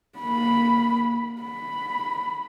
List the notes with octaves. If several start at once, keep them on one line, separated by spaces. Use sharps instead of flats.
A#3 B5
B5